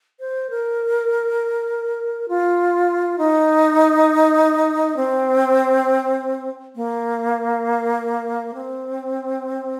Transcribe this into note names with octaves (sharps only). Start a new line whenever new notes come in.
C5
A#4
F4
D#4
C4
A#3
C4